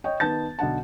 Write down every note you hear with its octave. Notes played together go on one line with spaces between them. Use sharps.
C#5 D#5 G5
D#3 B3 A5 G6 A6
B1 D3 F#5 A5